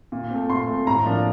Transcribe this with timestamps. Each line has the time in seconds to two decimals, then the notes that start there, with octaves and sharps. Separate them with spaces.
0.12 A#2
0.30 A3 C4
0.50 A#2 C6
0.68 A3 C4
0.87 A2 A#5
1.06 F3 A#3 D4